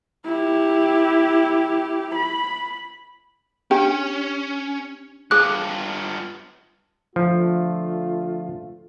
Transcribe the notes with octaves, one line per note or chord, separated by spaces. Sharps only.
E4 G4
B5
C#4 D4 G4 G5
G2 F4 G#4 D6 F#6
D3 F3 A3 F4